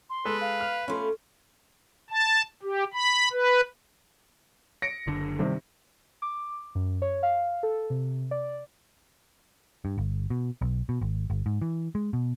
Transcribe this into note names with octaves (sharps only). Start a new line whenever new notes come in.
C6
G#3 A4 B4
F5
F6
A3 C#4 F4 B5 C6
A5
G4
B5
B4
A#6 C#7 D7
F#1 D3 D4
G2 C3 D#3
D6
F#2
C#5
F5
A4
C3
D5
G2
G1
B2
B1
B2
G#1
G1
G#2
E3
G#3
B2